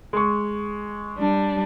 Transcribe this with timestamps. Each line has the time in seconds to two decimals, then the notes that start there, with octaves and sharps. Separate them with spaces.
0.13 G#3 C#6
1.18 G3 D4